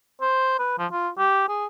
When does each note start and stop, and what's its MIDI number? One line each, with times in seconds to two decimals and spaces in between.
0.21 0.57 72
0.59 0.74 71
0.79 0.87 53
0.92 1.09 65
1.18 1.48 67
1.49 1.66 68